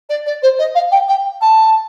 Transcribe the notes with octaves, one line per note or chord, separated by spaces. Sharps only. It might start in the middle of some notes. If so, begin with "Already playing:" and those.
D5
D5
C5
D#5
F5
G5
G5
A5